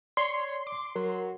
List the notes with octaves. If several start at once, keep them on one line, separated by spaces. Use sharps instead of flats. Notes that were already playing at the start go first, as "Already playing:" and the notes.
C#5 D5 C6
D6
F#3 A#4